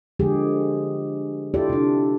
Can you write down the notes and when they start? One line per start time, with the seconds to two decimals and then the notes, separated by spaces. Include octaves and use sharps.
0.19 D3 F3 G#3 G4 G#4
1.54 E4 F4 G4 A4 D5
1.69 C3 D4